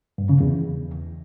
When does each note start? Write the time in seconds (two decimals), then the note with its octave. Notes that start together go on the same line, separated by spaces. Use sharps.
0.18 G2
0.29 C#3
0.40 E2